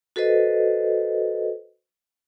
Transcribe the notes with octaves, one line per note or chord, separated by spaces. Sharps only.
F#4 A4 B4 C5 D#5